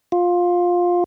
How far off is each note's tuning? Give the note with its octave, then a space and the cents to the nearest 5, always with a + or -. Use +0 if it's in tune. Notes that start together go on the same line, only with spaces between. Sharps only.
F4 +15